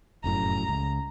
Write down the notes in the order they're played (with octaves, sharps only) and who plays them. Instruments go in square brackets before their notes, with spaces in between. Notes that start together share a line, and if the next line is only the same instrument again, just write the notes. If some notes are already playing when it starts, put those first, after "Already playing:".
[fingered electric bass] F1 F#2 A2 [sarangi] A#5
[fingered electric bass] C#2